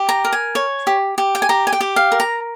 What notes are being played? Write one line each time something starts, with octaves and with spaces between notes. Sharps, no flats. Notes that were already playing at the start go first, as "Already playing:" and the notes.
Already playing: G4
A#5
A#4
G#5
C#5
G4
G4
G5
G#5
G4 A#5
G#5
G5
G4
F5
A#4
A#5